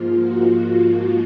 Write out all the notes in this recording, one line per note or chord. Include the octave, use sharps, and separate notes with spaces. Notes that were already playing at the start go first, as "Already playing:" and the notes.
Already playing: G#2 F3 A#3 F4
F#4
F#4